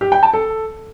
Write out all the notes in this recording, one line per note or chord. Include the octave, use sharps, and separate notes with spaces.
G4
G5
A5
A4